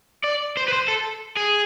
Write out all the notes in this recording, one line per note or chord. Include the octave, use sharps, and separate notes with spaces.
D5
C5
B4
C5
A4
G#4